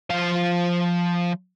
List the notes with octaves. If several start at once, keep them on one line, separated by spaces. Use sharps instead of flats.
F3 F5